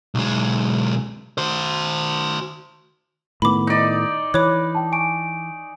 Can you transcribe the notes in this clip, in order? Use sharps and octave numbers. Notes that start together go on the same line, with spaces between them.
B1 G#3
F#4 C5
A2 D#3 B3 B5 D6
D#4 D5
E3 C#5 B5 D6 F#6
G5 A5
G#5 C#6 D7